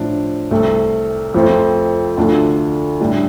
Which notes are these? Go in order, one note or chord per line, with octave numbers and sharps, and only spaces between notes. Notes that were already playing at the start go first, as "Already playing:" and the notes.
Already playing: A2 F3 D4
C2 C3 A3
F2 F3 A3 C4 F4
D2 D3 A3 D4 F4
A2 G3 D4